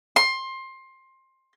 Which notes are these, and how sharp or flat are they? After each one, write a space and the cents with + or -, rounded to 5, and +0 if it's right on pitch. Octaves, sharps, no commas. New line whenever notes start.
C6 +20